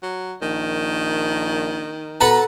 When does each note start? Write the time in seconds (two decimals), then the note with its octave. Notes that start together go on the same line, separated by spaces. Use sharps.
0.03 F#3
0.42 A#1 D#3
2.21 B2 A4 B4 F#5 A#5